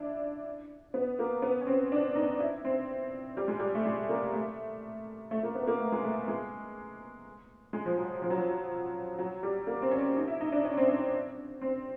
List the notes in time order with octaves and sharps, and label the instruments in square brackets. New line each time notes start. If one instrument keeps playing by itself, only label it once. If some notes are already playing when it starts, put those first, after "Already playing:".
Already playing: [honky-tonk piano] D4 E4
B3
A#3
B3
C#4
C4
D4
D#4
E4
C4
G3
G#3
G3
A3
G#3
A#3
A3
A3
A#3
B3
A#3
A3
G#3
A3
G#3
G#3
F3
F#3
F3
F#3
F3
F#3
G3
A#3
C4
C#4
D#4
E4
D#4
D4
C#4
C4
D4
C4